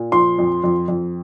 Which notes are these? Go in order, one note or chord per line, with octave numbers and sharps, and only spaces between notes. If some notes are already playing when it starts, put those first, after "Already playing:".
Already playing: A#2
F3 C6
F2
F2
F2